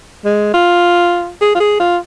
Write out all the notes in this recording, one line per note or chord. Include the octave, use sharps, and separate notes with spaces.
G#3
F4
G#4
F4
G#4
F4